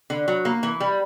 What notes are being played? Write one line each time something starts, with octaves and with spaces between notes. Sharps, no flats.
D3
F#3
A#3
E3
G3